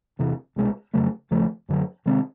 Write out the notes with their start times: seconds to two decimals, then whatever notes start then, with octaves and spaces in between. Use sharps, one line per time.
0.19 E2 C3 E3
0.56 C2 B2 G#3
0.94 F2 C#3 F#3 A3
1.31 D#2 C#3 F3 A3
1.69 F#2 D3 F#3
2.06 C3 D#3 G#3 C4